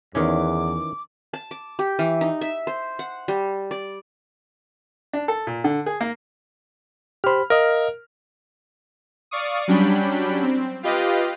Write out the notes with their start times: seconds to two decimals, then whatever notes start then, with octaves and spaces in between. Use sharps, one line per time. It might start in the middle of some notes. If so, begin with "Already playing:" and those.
0.15 E2 D#3 E3 C#4 D6
1.33 A5
1.51 D6
1.79 G4
1.99 E3
2.21 D#4
2.41 E5
2.67 C5
2.99 F#5
3.28 G3
3.71 D5
5.13 D4
5.28 A4
5.47 A#2
5.64 D3
5.86 G#4
6.01 A#3
7.24 G4 C5 B5 F6
7.50 A#4 D#5 F5
9.31 D5 F5 C#6 D#6
9.68 F#3 G3 C#4 D4 G5 B5
10.42 C4
10.83 F4 G4 B4 D#5 F5 G5